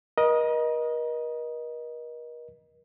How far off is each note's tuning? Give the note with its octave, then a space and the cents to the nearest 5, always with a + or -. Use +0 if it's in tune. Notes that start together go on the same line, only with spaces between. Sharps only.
A#4 +40 D#5 +0